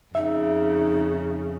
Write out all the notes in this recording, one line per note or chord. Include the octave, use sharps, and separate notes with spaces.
F2 C#3 D#4 E5